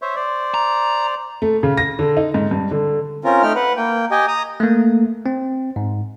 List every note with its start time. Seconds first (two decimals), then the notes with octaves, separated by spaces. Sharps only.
0.02 C5 C#5 E5
0.16 C5 D5
0.54 A#5
1.42 A3
1.63 C#3
1.78 A#6
1.99 D3
2.17 D#4
2.34 G#2
2.51 G2
2.71 D3
3.24 C4 C#4 F4 A#4
3.43 A3 D#4 G5 F6
3.55 B4 F#5
3.77 A#3 G5
4.11 G4 D#5 G5 G#5
4.28 A#5 D#6
4.60 A3 A#3
5.26 C4
5.76 G#2